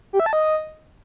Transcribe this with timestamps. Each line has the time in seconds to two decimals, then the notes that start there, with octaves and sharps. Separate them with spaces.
0.13 G4
0.20 E5
0.26 A5
0.33 D#5